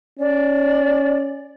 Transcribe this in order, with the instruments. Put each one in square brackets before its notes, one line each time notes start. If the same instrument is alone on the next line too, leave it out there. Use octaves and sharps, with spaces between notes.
[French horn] C#4 [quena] D5